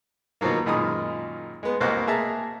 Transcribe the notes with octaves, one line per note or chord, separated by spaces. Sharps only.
B2 D#3 F3 F#3 A#3
F#2 A#2 D#3 G#3 B5 D#6
G#3 B3
C2 B2 A#3 C5 D#5 F#6
A#3 G#4 E5 A5 A#5